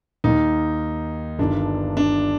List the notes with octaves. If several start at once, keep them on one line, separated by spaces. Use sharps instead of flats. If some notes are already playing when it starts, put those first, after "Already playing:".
D#2 D#3 D#4
G1 G2 D#3 D4
D4